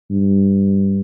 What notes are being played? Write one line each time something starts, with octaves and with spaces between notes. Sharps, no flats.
G2